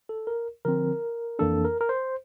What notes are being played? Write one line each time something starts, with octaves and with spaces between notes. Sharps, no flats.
A4
A#4
D3 F3 C4 A#4
F2 E3 A#3 D4 A4
A#4
A#4
C5